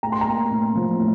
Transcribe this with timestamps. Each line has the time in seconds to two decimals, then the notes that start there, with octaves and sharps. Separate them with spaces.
0.03 A2 A#5
0.12 C6
0.21 A#5
0.26 A#3
0.51 A2
0.75 F3
1.00 A2